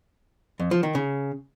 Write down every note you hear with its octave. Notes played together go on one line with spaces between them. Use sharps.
F2
F3
D#3
C#3